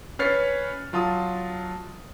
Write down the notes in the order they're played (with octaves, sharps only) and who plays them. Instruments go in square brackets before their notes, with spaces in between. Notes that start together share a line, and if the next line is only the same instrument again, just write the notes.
[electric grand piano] C#4 B4 C#5 F6 A6 C7
F#3 F4 A5 D#6